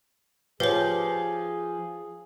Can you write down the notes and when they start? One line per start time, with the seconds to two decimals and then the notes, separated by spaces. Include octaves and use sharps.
0.60 F3 G4 G#4 B4 C#5